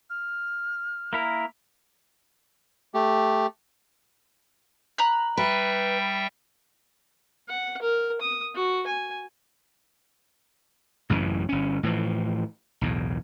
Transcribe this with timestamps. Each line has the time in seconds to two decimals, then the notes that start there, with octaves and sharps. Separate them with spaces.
0.10 F6
1.13 A#3 E4 A#4
2.94 A3 G4
4.98 A#5 B5 F#6
5.37 G3 B4 E5 G5
7.48 F#5
7.81 A#4
8.21 D#6
8.55 F#4
8.87 G#5
11.10 A1 F#2 C#3 E3
11.49 G1 C#4
11.83 A2 E3 F3
12.81 B1 E2 A2